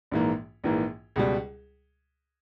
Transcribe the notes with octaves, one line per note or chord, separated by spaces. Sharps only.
A#1 G#2 E3 A#3
A#1 G#2 E3 A#3
C#2 B2 G3